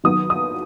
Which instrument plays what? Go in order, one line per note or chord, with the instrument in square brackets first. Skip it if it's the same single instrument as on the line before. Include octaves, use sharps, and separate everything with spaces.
[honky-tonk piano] D#3 F#3 B3 D#6
D#6